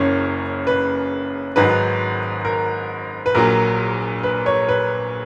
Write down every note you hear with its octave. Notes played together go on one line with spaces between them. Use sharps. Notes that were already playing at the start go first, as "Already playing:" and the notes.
Already playing: F#1 F#2 C#3 C#5
B4
G#1 G#2 D#3 F#3 B4
A#4
B4
A#1 A#2 F#3 A#4
B4
C#5
B4